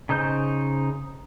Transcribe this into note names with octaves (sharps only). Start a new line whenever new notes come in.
C#3 D#4 C5 G6